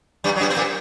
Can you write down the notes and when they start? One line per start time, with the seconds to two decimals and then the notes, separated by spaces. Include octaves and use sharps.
0.24 G2 G3
0.36 F#3
0.41 G2 G3
0.50 C4
0.56 A#2 A#3